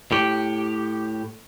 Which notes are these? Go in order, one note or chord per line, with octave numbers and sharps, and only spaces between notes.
A2 G4